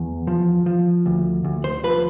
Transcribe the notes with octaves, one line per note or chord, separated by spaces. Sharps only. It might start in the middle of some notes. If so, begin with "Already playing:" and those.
Already playing: E2
F3
F3
D2
D2
C5
F3 B4